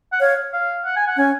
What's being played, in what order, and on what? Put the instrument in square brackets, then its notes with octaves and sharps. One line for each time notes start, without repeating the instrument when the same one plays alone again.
[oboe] F#5
[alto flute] C#5 [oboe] F5
[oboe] F5
F#5
G#5
F#5
[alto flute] C#4 [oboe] G#5